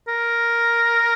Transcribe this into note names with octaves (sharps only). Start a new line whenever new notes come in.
A#4